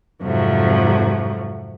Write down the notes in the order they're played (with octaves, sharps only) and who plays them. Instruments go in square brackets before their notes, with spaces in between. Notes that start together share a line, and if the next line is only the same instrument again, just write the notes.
[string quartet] F2 G#2 C3 F3 F#3 A3